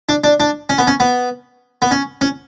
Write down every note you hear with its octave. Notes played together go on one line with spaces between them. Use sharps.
D4
D4
D4
C#4
B3
C#4
B3
B3
C#4
C#4